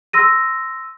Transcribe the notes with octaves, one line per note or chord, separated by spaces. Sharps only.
C6 E6 A#6 D#7